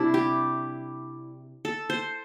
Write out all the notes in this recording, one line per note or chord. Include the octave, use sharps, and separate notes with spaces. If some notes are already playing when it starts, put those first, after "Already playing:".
Already playing: C3 G3 D4 E4
G4
A4
C5